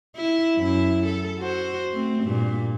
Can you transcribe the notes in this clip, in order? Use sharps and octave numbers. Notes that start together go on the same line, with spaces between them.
E4
F#2 E4
A4
F#4 C5
A3 C4
G2 A#2